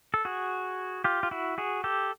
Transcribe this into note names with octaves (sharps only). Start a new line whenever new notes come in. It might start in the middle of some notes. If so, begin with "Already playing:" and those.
A4
F#4 G#4
F4 G4
F4
E4 F#4
F#4 G#4
G4 A4